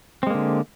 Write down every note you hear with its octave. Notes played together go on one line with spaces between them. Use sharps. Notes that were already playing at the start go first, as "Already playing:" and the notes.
D3 G#3 A#3 C4